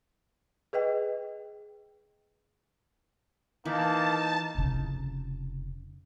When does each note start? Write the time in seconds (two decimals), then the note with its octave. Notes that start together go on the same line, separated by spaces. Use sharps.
0.73 G#4 B4 D#5 G5
3.65 E3 A#3 D#4 A5
4.55 F1 C#3